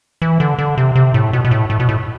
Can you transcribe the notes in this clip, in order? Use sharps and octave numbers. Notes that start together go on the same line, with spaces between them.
E3
D3
D3
C3
C3
A2
B2
B2
A2
A2
B2
A2